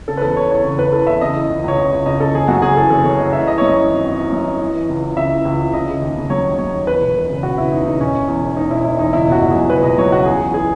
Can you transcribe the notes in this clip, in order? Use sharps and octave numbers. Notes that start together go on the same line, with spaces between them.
C#3 A4
B4
E2 A4
E2 C#5
E2 C#5
C#3 C#5
C#3 B4
E3 A4
E2 E5
C#3 D#5
E3
C#2
C#2 C#5
C#2 D#5
C#2
C#3 D#5
C#3 A4
F#1 G#4
F#2 F#4
F#1 G#4
E3 A4
F#1 A4
F#1 C#5
F#1 D#5
E3 E5
E3 D#5
F#2 C#5
D#5
E3
G#1
G#1
E3
F#2
E3
E3
E3
C#2
E3
C#3 E5
E3
C#2
E3
C#3 D#5
C#3
D#2
C#3
F#3 C#5
D#2
F#3 C#5
D#2
E2 B4
E1
E1
C#3
E1 F#4
C#3 E4
E2 D#4
C#3 D#4
E1 C#4
E1
E2
E1
E2 D#4
E1 E4
E1 E4
E2 D#4
C#2 E4
B2 F#4
B2
F#3 G#4
C#2 B4
B2 D#5
F#3 C#5
C#2 F#4
E2 G#4
E2
E3 G#4